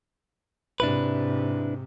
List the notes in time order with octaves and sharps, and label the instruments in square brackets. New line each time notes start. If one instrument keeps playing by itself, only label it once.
[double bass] G#2 C3 [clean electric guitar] D4 E4 B4